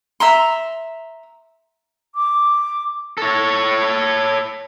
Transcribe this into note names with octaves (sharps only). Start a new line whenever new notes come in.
E5 A#5 C6
D6
A4 C#5